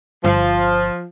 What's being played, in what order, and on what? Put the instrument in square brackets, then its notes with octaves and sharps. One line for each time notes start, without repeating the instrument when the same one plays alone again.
[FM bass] G1 [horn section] F3